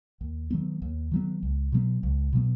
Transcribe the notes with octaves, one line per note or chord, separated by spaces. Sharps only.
D#2
D#3 F#3 B3
D#2
D#3 F#3 B3
C#2
B2 F#3 B3
C#2
B2 F#3 B3